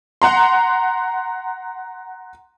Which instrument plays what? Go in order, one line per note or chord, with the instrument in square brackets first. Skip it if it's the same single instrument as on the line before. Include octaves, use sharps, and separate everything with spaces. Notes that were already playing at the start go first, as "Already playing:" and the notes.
[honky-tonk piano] F#5 A#5 C6